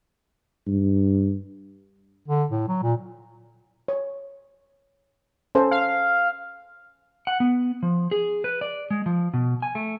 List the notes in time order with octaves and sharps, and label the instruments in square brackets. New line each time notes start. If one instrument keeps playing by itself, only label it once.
[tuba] G2
[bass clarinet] D3
A2
F#3
A#2
[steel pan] C#5
C#4 A4 C5
[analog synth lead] F5
[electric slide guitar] F#5
B3
F3
G#4
B4
D5
G#3
F3
B2
G#5
A3